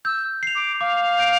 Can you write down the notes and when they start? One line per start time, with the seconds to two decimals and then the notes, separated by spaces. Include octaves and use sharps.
0.05 E6 G6
0.43 C7 F7
0.55 D6
0.81 F5 D6
1.18 G6 D7 F7